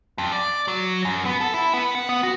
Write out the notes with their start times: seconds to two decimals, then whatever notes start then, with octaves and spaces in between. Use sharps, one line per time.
0.18 F2
0.32 D5
0.68 F#3
1.05 F#2
1.25 B3
1.41 A4
1.54 E4
1.73 B3
1.95 F#5
2.09 B3
2.23 F#4